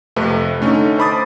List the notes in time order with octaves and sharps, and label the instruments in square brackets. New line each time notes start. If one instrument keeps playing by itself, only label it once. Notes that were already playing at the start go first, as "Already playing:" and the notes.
[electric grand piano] F2 C3 A3 B4
D3 A3 C#4 D#4
C5 A5 B5 D6 D#6 A6